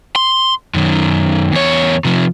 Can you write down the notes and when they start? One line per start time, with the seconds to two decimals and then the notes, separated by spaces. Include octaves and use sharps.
0.16 C6
0.74 F#2 D#3
1.53 E2 C#5
2.05 C3 F3